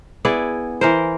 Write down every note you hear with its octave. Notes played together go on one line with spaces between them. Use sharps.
B3 E4 G#4 D5
E3 A#4 C5